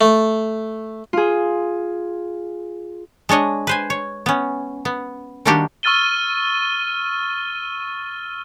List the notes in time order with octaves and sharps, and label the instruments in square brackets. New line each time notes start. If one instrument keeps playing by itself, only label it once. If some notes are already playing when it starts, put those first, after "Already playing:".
[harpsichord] A3
[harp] F4 G#4
[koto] G#3 D4 C#5 D#5
B4 C5 G#5
C#5
B3 C#4
B3
D#3 G3 A#3 D4 F#4 G4
[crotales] C#6 E6 F6 A6 D#7 G7